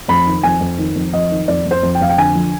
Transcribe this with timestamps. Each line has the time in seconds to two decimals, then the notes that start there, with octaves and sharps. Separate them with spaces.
0.08 F2 B5
0.26 D#3
0.43 F2 G#5
0.61 F2
0.78 D#3
0.96 F2
1.13 F2 D#5
1.30 D#3
1.48 F2 D5
1.65 F2
1.71 C5
1.83 F2
1.95 G5
2.01 F2 F5
2.09 G5
2.17 D3 G#5
2.35 F3